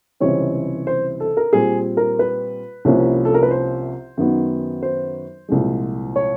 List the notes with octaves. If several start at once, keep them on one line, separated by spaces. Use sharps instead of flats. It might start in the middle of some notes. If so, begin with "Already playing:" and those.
C#2 C3 E3 G3 C4 C#5
C5
A4
A#4
A#2 G3 C4 G#4
A#4
B4
C2 C3 F3 A#3 C#4
A4
A#4
B4
C5
F#2 D#3 F#3 B3
C5
C2 A#2 F3 G#3
C#5